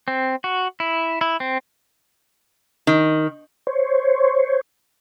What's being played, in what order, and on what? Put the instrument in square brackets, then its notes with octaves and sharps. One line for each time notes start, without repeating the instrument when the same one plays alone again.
[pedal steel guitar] C4
F#4
E4
E4
C4
[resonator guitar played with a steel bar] D#3
[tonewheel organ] C5 C#5